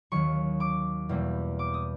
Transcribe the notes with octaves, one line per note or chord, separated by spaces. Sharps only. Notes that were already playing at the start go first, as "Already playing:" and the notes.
D#2 D#3 F#3 C#6
D6
E2 B2 G3 A#3
D6
D#6